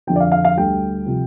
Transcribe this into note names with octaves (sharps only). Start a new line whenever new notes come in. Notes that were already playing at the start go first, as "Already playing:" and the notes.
F2 D3 F3 G5
D5
F5
F5
F5
D2 D3 G3 G5
C3 F3